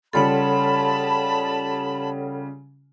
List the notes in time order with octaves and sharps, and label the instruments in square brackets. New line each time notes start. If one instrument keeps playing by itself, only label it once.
[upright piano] C#3 G3 F4 [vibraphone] A4 C#5 F#5 [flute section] A5 B5